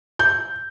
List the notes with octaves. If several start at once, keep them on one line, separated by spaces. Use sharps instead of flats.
G6